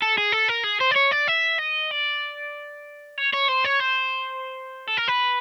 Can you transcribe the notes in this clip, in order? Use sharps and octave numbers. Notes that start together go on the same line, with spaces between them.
A4
G#4
A4
A#4
G#4
C5
D5
C#5
D5
E5
D#5
D5
C#5
C#5
C5
C#5
C5
A4
A#4
B4